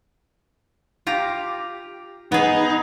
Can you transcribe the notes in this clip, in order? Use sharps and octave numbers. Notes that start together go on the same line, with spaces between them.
F4 G4 A#5
B3 D#4 G#4